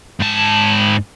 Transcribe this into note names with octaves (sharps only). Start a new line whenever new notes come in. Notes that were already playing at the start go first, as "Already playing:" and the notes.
G#2 A5